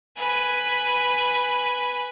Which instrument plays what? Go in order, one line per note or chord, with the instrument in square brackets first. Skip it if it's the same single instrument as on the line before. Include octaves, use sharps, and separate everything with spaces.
[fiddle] B4 G#5